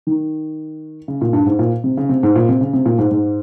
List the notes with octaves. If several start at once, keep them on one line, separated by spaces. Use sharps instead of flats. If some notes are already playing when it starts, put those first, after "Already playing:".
D#3
C#3
A#2
G2
G#2
A#2
C3
C#3
C3
G#2
A#2
C3
C#3
C3
A#2
G#2
G#2